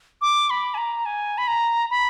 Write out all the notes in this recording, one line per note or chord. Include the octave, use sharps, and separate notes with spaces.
D6
B5
G#5
A#5
G#5
B5
A#5
B5